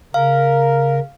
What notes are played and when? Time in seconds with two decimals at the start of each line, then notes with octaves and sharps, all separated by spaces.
0.14 C#3 A#4 F5